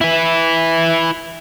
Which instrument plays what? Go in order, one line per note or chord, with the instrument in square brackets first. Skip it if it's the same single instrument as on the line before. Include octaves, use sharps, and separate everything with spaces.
[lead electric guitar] E4 B4